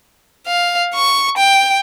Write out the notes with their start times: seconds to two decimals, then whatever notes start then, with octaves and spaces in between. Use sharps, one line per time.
0.47 F5
0.94 C#6
1.38 G5